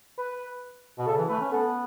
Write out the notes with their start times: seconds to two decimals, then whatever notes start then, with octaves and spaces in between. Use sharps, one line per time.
0.18 B4
0.99 B2
1.06 C#3 A4
1.18 E3
1.28 A3 B4
1.40 C#4
1.52 B3 A4